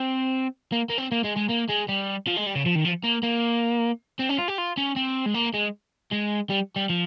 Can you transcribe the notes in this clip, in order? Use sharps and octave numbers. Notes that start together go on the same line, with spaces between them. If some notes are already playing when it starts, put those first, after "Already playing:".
Already playing: C4
A#3
A#3
C4
A#3
G#3
G#3
A#3
G#3
G3
F3
G#3
G3
C#3
F3
D#3
F3
A#3
A#3
C4
C#4
F4
G4
F4
C#4
C4
G#3
A#3
G#3
G#3
G3
G3
F3